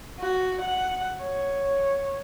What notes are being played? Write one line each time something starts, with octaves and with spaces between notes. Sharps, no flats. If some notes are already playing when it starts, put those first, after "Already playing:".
F#4
F#5
C#5